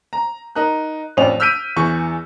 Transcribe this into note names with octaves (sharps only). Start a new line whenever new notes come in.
A#5
D#4 A#4 F#6
A1 F2 C#4 D4 F7
E6 F6 G6 B6 D7 D#7
E2 E3 C#6